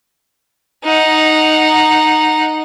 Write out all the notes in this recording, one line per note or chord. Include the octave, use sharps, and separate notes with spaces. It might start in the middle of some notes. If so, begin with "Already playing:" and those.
D#4 F#5